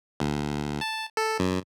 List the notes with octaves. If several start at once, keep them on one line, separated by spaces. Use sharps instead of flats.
D2
A5
A4
F#2